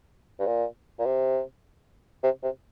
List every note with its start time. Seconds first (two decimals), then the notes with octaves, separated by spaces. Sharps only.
0.39 G2
0.47 A#2
0.99 A#2
1.05 C3
2.23 C3
2.43 C3